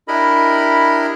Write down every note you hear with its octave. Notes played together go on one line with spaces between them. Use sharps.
D4 E4 G4 A#4 D#5 B5